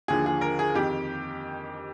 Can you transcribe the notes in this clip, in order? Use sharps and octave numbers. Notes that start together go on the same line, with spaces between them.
D#2 D3 F3 G#4
G#4
A#4
G#4
F2 D#3 G4